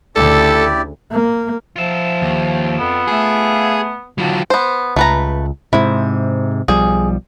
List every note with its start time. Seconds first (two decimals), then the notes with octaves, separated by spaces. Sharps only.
0.16 D2 C#3 E4 G4 A4 D5
1.12 A#3
1.76 F3 F4 E5
2.22 D#2
2.79 F2 B3
3.08 A3 G#4
4.18 A2 D3 D#3 F#3 F4
4.50 B3 C5
4.96 C#2 A3 B4 A#5
5.73 G#2 C3 E4
6.68 B1 F3 G3 G#4